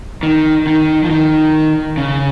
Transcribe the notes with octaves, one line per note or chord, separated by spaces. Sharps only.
D#3
D#3
F3
D#3
C#3